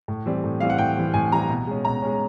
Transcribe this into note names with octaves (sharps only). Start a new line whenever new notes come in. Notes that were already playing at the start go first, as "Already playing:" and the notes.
A2
E3 G3 C4
A2
E3 G3 C4 F5
F#5
A2 G5
E3 G3 C4
A2 G#5
E3 G3 C4 A#5
B2
G#3 C#4
B2 A#5
G#3 C#4